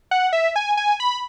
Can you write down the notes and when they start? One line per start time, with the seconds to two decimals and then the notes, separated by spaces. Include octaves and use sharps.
0.11 F#5
0.33 E5
0.56 G#5
0.77 G#5
1.00 B5